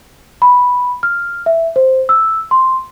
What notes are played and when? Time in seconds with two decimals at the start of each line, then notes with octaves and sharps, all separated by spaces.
0.42 B5
1.03 F6
1.46 E5
1.76 C5
2.09 E6
2.51 C6